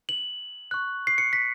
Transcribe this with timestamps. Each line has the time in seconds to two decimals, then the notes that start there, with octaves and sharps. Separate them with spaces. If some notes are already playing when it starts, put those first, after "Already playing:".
0.09 F#7
0.71 C#6 F#6
1.07 C7
1.18 C#7
1.33 B6